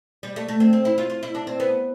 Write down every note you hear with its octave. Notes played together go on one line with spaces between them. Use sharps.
G3
A3
A3
C4
C4
E4
F4
F4
E4
D4
C4
B3